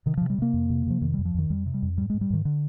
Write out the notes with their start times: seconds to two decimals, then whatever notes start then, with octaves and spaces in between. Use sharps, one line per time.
0.06 C3 D#3
0.17 C3 F3
0.30 G3
0.38 C3 A#3
0.53 F2
0.69 C3
0.87 C3 F3
1.01 F2 D#3
1.14 F2 G3
1.25 F3
1.34 F2 D#3
1.50 F2 G3
1.66 C3
1.74 G3
1.82 F2
1.97 G#2 G3
2.10 G#2 G#3
2.21 G3
2.30 G#2 D#3
2.45 D3